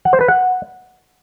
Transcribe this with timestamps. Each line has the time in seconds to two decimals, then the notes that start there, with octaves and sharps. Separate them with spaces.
0.05 F#5
0.13 C5
0.21 B4
0.28 F#5